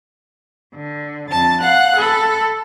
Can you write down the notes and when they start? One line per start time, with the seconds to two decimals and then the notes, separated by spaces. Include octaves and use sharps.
0.75 D3
1.29 F2 A5 A6
1.61 F5 F#5 F#6
1.96 A4 B5